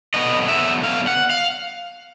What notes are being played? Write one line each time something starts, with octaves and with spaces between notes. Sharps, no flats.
D3 F#3 B3 D#5
E5
F5
F#5
F5